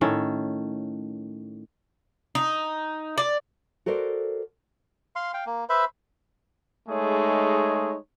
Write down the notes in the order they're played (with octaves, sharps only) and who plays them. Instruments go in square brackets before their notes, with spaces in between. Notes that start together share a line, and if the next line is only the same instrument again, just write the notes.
[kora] A2 D#3 C#4 A4
[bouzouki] D#4
D5
[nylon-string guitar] F#4 A4 A#4 C5 D5
[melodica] F5 C6
F5 G5
A#3
B4 C5 E5 B5
[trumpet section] G#3 A3 D#4 G#4 C#5